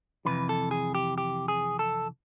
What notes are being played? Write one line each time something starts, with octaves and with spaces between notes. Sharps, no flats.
F2 C3 E3 B4
A4
G#4
G4
G4
G#4
A4